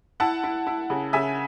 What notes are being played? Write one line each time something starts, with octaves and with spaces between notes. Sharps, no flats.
E4 F#5 A5
E4
E4
C#3
C#3 E5 G#5